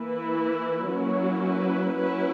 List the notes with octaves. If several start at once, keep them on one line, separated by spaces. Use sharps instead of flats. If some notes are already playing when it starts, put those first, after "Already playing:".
Already playing: E3 A#3 E4 B4
F#3 A#3 C#4 E4 C#5
B4
F#3 C#4 E4 B4